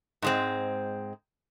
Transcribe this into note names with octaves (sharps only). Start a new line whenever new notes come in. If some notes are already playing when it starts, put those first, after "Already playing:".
G#2 G#3 C4